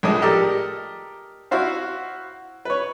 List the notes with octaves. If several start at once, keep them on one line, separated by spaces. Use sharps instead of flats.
A#1 A2 G#3 G#5 D#6
G4 A4 A#4 D5 D#5
E4 F#4 C5 F5
B4 C#5